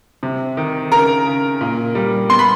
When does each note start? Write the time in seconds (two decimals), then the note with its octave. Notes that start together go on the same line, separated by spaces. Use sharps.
0.23 C3
0.57 D#3
0.92 C#3 A#4 A#5
1.26 C#3
1.61 A#2
1.95 G3
2.29 B3 C6
2.39 B5